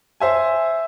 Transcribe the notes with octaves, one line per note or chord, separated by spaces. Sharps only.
C5 E5 G#5